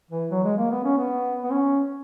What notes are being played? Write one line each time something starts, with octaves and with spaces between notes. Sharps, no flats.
E3
F#3
G#3
A#3
B3
C#4
B3
B3
C#4